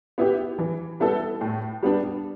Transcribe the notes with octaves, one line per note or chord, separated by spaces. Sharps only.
B3 E4 G4
E3
G3 B3 E4 A4
A2
G3 B3 D4